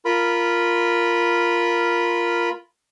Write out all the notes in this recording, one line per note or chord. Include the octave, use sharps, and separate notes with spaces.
F4 A#4 B5